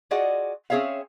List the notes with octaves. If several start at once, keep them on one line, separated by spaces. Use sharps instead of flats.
F4 F#4 G#4 D5 D#5 F#5
C4 C#4 G#4 C#5 E5 F5